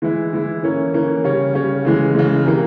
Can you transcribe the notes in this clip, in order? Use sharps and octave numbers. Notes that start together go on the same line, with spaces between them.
E3 G#3 E4
E3 G#3 E4
E3 A#3 C#4
E3 A#3 C#4
C#3 G3 C#4
C#3 G3 C#4
C#3 E3 G#3
C#3 E3 G#3
C3 E3 A#3